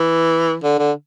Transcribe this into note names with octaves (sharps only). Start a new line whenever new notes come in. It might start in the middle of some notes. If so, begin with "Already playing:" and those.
Already playing: E3
D3
D3